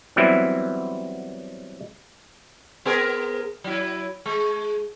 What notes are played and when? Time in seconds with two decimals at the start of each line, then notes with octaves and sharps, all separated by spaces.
0.16 E3 F#3 G3 B3 C4 E4
2.85 B3 G#4 A#4
3.64 F#3 E4
4.26 G#3